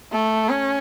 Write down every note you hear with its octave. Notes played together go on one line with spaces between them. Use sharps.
A3
C#4